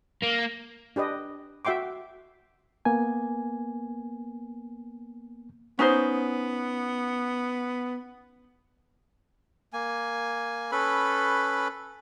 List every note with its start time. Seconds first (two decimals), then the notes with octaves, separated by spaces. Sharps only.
0.23 A#3
0.96 D4 G4 B4 D#5
1.65 F#4 E5 G5 C6 D6
2.85 A#3 B3 G#5
5.79 B3 C#4 D#4 C5
9.73 A#3 G#5
10.72 C#4 A4 B4 B5